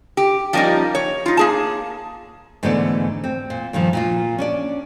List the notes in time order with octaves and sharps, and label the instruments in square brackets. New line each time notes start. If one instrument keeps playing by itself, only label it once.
[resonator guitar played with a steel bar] G4
F3 G3 A#3 C#4 D#4
C#5
D#4 F4
A#3 G#4 A5
[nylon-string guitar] G#2 D3 E3 A3 B3 D5
C4
A#2
G2 A#2 D#3 F3
A#2 A#3 F4
C#4 D4 D5